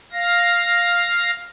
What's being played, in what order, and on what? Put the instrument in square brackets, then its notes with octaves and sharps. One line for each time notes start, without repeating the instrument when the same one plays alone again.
[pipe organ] F5 A#6